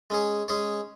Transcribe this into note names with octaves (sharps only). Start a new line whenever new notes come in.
G#3 C#4 G#4 C#5
G#3 C#4 G#4 C#5